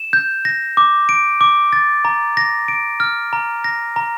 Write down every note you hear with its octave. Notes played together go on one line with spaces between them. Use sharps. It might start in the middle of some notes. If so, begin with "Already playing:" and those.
Already playing: E7
G6
A#6
D6
D7
D6
A6
A#5
A#6
D7
F6
A#5
A#6
A#5